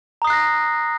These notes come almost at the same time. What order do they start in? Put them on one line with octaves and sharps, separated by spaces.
A#5 D#6 C7 F#6 A#6